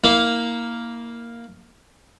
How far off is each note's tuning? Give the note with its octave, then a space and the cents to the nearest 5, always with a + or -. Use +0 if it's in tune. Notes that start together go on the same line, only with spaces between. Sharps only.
A#3 +0 E4 -30 F5 +0